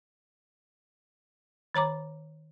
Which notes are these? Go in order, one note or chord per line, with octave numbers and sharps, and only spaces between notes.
D#3 C#5 A#5 D6